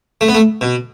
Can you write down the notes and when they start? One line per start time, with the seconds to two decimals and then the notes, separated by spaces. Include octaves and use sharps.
0.21 A3
0.28 B3
0.35 A3
0.61 B2